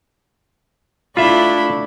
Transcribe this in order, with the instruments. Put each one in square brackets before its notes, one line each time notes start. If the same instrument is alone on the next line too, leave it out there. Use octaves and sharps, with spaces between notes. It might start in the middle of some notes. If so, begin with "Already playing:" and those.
[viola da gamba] A3 D4 E4 [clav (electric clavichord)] F4 E5 [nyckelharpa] B5